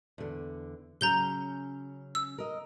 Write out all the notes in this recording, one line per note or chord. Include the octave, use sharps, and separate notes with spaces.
E2 D3
C#3 F#3 C#4 A#5 G6 G7
E6
A#4 D#5